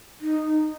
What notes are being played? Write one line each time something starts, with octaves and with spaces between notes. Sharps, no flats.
D#4